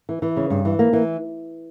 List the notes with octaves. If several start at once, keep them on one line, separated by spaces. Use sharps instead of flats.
E3
E3
C#3
G2
E3
A#3
E3